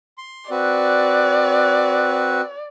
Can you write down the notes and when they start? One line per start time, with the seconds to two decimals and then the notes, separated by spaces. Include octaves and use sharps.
0.18 C6
0.50 C4 F#4 B4 D5